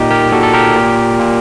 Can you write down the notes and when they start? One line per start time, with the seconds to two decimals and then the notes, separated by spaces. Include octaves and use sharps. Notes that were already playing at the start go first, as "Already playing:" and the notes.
Already playing: A#2 D#4 G4
0.10 G4 A#4
0.32 A#2 F#4 A4
0.43 A4
0.54 G4 A#4
0.76 A#2
1.19 A#2